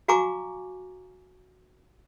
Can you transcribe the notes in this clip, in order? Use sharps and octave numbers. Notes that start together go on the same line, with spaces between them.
F#4 F5 G#5 A#5 C#6 D6